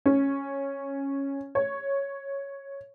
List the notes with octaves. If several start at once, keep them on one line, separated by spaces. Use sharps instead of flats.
C#4
C#5